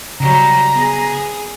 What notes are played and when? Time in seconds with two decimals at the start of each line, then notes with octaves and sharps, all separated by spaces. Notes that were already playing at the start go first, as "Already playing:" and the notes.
0.20 C#3 F#3 G3 A#5
0.71 B3 G#4